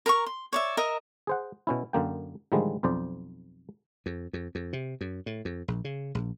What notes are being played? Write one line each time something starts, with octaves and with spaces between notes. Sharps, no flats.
A#4 A#5 B5 C#6
C6
C#5 D5 E5
A#4 D#5 E5 A#5
G#4 C5 F#5
B2 C#4 E4
F#2 D3 A#3 G5
A2 D3 D#3 F3 G3 G#3
B1 F2 C5 D5
F2
F2
F2
C3
F#2
A2
F2
A#1
C#3
A#1